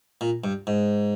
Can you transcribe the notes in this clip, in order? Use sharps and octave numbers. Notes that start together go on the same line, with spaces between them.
A#2
G2
G#2